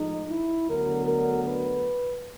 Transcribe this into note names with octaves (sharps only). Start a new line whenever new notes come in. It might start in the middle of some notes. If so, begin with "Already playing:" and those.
Already playing: A2 F3 G#3 D#4
E4
D2 D3 F#3 B3 A#4
A#4
B4